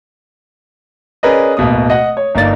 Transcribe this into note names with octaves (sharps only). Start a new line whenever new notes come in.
C#4 G#4 A#4 B4 D5 D#5
D1 B2 A#3 D#6
D#5 F#5
C#5
G1 A#3 D#4 D5 A6